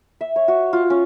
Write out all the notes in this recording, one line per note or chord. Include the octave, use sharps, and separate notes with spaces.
E5
C#5
F#4
F4
C#4